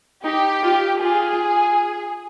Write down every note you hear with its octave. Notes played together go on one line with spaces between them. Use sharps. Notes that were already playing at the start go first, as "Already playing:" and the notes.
D#4 G4
F4
F4 G#4